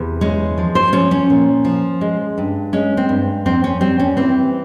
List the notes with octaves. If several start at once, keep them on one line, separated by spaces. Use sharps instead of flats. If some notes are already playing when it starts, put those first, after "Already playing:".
Already playing: E2 C3
G#3 C#4
F3
C5
F3 C#4
C#4
A#2
F3
G#3
G2
G#3 C#4
C4
G2
F2 C4
C#4
G3 C4
C#4
E3 C4